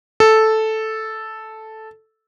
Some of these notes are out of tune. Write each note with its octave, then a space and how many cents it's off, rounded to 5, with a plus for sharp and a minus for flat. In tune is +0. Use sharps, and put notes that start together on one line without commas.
A4 -5